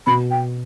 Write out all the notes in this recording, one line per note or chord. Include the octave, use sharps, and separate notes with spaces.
B2 B5
G5